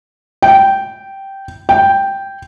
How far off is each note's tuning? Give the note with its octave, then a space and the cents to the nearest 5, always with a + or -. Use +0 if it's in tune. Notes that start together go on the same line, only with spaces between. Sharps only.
G5 -10
G5 +0